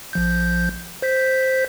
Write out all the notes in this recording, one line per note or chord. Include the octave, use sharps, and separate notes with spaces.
A#1 F3 G6
C5 G6 B6